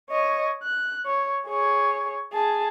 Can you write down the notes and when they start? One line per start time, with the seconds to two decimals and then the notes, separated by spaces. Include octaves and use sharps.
0.11 C#5 D#5
0.63 F#6
1.06 C#5
1.47 G#4 C#5
2.33 G#4 A5